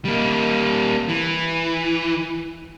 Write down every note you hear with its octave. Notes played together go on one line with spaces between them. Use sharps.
G3 A#3
E3